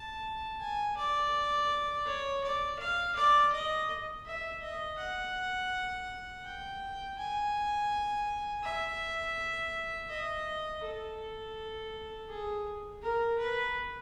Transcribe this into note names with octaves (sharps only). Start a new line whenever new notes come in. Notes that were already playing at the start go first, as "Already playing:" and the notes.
Already playing: A5
G#5
D5
C#5
D5
F5
D5
D#5
E5
D#5
F#5
G5
G#5
E5
D#5
A4
G#4
A#4
B4